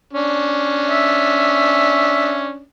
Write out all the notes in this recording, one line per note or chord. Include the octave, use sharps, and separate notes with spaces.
C#4 D4
E5